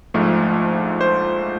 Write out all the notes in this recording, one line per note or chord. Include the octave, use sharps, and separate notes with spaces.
A#1 G#2 F3 A3
C5